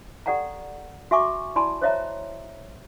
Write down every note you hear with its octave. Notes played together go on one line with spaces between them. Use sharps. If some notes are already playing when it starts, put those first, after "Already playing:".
G4 A4 D5 F#5 G5 A#5
F#4 E5 G#5 C#6 D6
E4 D5 G#5 A5 B5 C6
C5 C#5 D#5 E5 A#5